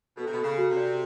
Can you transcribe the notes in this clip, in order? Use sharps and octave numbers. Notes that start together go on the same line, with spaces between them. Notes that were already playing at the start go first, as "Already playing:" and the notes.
B2 A4
C3
B2 A4
C#3
F#4
C3
D5